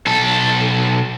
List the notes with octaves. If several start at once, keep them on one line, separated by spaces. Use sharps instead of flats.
B1 A4